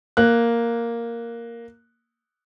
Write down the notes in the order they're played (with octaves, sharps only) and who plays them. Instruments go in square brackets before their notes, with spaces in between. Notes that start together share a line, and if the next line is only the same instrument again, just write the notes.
[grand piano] A#3 F#6